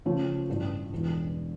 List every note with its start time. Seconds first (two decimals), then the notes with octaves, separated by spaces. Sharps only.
0.05 C#3 F3 A3 C#4
0.49 A1 G2 E3
0.92 E1 E3